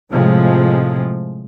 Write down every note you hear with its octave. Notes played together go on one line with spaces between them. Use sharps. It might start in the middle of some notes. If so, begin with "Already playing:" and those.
A2 C3 F3 G#3